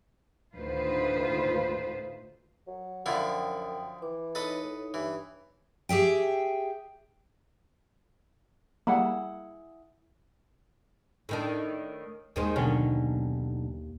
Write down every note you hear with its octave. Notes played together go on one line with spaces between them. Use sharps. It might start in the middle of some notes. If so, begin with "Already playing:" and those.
D2 A2 D#3 F4 B4 C5
F#3
F#2 D3 F3 E4 G5 D#6
E3 D6
D#4 A4 B4 C#5 D#5
A2
G2 E3
G4 G#4 E5 G5
G3 A#3 E4 G#4 F#5
A2 D#3 D4
D#2 D#3 G#3 C4
B1 D3 D#3 C#4